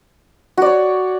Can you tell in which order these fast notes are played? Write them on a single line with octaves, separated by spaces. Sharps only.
F#4 D5 C#5